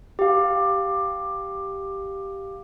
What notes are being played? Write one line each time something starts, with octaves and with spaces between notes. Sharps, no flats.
G4 F5